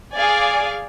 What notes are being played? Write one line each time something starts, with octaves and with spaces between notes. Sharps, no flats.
G#4 D5 F5 G#5